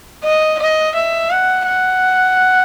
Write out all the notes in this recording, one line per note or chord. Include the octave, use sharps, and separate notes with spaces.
D#5
D#5
E5
F#5
F#5